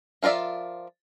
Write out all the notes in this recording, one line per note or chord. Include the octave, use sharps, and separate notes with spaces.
F3 F4 A#4 D5 E5